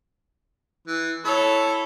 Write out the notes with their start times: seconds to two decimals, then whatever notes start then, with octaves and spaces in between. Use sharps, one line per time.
0.87 E3
1.25 E4 A4 C#5